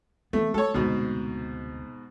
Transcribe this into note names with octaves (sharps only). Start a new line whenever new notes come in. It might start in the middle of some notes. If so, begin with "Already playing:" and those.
E3 A3 B3
A3 A4 C#5
F1 D2 G#2 B2